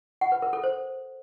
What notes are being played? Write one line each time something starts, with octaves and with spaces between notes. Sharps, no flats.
F#5
B4
A#4
A4
C5